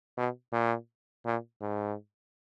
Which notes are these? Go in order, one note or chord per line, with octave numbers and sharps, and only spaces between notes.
B2
A#2
A#2
G#2